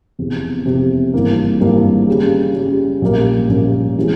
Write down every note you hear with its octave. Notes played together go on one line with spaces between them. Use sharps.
F1 E2 C3
F1 E2 C3
G#1 G2 E3 A#3
G#1 G2 E3 A#3
C#3 G3 C#4
C#3 G3 C#4
A#1 A#2 G3 A#3 C#4
A#1 A#2 G3 A#3 C#4
E3 G#3 C4